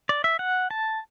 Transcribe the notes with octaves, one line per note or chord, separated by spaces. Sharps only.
D5
E5
F#5
A5